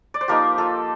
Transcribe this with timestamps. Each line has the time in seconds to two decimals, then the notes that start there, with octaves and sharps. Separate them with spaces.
0.14 D5
0.21 C5
0.28 F3 A#3 D#4 G4 A#4
0.58 F4 A4